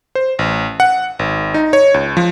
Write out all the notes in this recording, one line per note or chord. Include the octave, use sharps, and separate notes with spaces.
C5
A1
F#5
G#1
D#4
C#5
C#2
F3